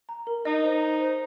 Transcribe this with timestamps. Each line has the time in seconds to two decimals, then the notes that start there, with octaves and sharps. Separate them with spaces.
0.09 A#5
0.27 A#4
0.45 D#4 D#5
0.64 C5
0.82 A#5
1.01 C5